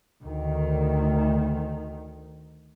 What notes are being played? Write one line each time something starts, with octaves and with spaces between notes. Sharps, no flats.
D2 D#3